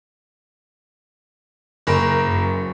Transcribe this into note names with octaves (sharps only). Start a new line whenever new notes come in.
F#1 A#4
F#2